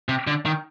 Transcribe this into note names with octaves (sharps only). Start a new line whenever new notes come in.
C3
D3
D#3